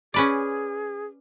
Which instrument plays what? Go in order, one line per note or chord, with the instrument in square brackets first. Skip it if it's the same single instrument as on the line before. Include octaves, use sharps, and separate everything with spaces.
[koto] C#4 B4 D5 [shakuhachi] G#4